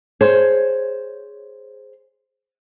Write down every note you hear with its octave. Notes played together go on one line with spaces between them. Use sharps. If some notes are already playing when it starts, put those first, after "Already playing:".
G#4 C5 C#5